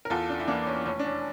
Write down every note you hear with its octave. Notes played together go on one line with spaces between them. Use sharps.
A#4
E2 F4 A4
D4
E4
E3 A#3 D4
C#4
F1 C#4
D4
C#4